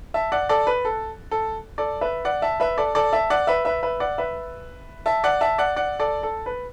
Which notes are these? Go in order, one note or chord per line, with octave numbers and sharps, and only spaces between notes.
E5 A5
D5 F#5
A4 D5
B4
A4
A4
A4 D5
B4 E5
D5 F#5
E5 A5
B4 E5
A4 D5
A4 D5
E5 A5
D5 F#5
B4 E5
B4 E5
B4 E5
D5 F#5
B4 E5
E5 A5
D5 F#5
E5 A5
D5 F#5
D5 F#5
A4 D5
A4
B4